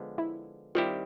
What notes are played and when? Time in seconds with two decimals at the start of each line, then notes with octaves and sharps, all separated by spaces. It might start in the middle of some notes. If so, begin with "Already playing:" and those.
Already playing: D3 F3 G#3 B3
0.18 E4
0.75 D#3 G3 C4 E4 F4 G4